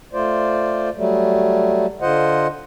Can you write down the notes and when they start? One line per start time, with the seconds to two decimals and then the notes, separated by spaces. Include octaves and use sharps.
0.13 A3 F4 C5 D5
0.96 F#3 G3 A3
2.01 D3 F4 C5 D#5 F#5